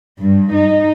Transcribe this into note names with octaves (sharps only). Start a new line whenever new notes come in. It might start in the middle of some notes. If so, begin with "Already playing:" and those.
G2
D#4